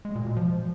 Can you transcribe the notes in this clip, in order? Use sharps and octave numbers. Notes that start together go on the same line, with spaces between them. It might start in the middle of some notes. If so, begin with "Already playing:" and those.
G#3
A#2
B2
F3